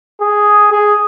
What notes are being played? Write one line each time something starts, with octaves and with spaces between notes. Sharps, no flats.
G#4
G#4